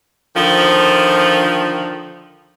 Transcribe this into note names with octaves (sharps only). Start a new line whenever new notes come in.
D3 D#3 F3